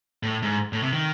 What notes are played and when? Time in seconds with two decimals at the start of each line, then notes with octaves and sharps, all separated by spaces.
0.23 A2
0.43 G#2
0.73 A2
0.82 C3
0.93 D#3